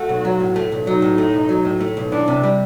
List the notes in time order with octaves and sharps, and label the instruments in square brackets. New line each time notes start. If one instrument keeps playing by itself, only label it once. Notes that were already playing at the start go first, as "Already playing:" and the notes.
Already playing: [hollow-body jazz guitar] A3 [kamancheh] F#4
[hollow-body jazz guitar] B1
F#3
A2
A3
B1
[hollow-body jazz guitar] F#3 [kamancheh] D#4
[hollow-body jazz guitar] A2
A3
B1
F#3
A2
A3
B1
[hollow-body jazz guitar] E3 [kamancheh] D4
[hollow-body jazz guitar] C3
G3